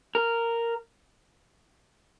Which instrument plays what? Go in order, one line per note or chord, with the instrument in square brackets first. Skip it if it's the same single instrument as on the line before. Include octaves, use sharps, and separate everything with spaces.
[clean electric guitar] A#4